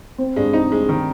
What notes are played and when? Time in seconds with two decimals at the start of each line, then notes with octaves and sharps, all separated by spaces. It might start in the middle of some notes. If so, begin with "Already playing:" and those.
0.18 C4
0.36 G2 G#3
0.53 C4 D#4
0.72 G#3 D#4
0.89 D#3 D#4